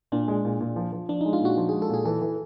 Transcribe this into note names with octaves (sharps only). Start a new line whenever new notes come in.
A#2 D4
G#3
A#2
A#2
F3
F3
F3 D4
G#3 D#4
F4
A#2 F#4
F3
G#3 G#4
A4
A#2 G#4
E3 A4
E3